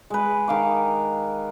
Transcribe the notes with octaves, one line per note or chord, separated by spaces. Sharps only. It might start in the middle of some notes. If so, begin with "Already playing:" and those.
G#3 B4
D#3 F5 D6